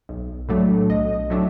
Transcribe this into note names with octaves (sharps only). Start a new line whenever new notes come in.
B1
A2 F#3 A3 D4
B1 D#5
A2 F#3 A3 D4